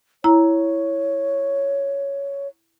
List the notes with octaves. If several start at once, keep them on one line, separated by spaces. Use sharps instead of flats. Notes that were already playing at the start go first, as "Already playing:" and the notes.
E4 C#5 A#5